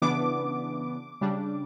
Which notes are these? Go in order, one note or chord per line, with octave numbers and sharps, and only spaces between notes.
C#3 E3 B3 D4 D6
C#3 G3 D4